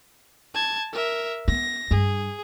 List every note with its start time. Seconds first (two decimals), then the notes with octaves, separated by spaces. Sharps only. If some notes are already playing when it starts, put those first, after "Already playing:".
0.54 A5 G#6
0.93 A#4 E5
1.48 B3 A#6
1.91 G2 G#4